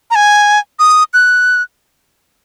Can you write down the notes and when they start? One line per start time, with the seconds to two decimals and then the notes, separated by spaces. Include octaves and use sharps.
0.11 A#5
0.15 G#5
0.79 D#6
1.14 F#6